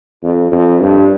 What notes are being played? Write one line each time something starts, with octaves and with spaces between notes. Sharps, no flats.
F2
F2
G2